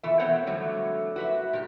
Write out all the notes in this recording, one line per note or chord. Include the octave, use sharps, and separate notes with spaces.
B2 E3 F4 A4 E5
A3 B3 C4 C5 C#5 F#5
F2 D3 F#3 G3 A3
F#4 B4 E5
A#2 G4